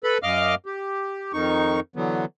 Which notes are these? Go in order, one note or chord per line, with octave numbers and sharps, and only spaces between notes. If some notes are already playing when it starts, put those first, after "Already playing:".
A4 B4 B5
F#2 D#5 F5 D6 F6
G4
F2 D#3 D#4 C#6
D3 E3 F#3 B3